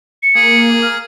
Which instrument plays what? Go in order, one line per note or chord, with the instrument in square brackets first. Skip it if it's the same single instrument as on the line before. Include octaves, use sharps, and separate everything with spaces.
[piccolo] C#7
[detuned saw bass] A#3 [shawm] G#4
[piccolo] F6